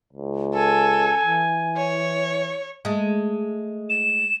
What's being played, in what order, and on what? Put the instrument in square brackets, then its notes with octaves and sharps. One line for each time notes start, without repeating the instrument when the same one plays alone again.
[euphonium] C#2
[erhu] A4 [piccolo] G#5
[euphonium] E3
[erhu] C#5
[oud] G#3 A3
[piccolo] E7